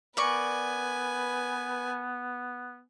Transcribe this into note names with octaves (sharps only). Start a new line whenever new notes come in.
B3 A#4 B4 D5 G#5 C#6